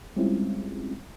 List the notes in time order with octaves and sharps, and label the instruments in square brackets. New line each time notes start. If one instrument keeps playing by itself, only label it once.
[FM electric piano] G3 G#3 C4 C#4 E4 F4